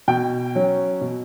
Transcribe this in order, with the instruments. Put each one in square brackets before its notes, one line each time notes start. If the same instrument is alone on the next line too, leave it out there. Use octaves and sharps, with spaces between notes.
[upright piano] B2 G5
F#3 C#4
B2